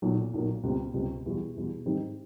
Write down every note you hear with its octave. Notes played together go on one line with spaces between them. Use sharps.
B1 A#2 F#3 A#3
B1 A#2 F#3 A#3
C#2 B2 G3 C4
C#2 B2 G3 C4
E2 B2 G3
E2 B2 G3
G#2 D#3 G3 C4 D#4